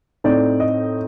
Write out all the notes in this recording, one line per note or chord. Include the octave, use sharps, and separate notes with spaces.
A2 A3 C4 D#4 D5
D#5